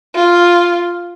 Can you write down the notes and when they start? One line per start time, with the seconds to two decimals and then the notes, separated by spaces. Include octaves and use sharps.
0.15 F4